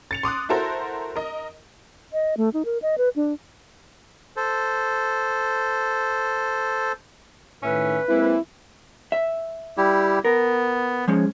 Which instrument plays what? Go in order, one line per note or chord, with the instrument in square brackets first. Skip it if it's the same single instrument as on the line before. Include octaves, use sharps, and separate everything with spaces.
[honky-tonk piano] A6 C#7 F7
C6 D6 D#6 F#6
E4 F#4 A4 A#4 C5
A#4 D#5
[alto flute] D#5
A3
D#4
A#4
D#5
B4
D4
[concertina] A4 C5
[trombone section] A2 D#3 [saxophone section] C#4 E5 [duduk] B4
[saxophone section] E3 [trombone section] G#3 A#3 C4 [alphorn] E4
[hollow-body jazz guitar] E5
[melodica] G3 E4 G4
[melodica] B3 [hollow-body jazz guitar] A#4
[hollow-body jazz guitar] F3 G#3 C#4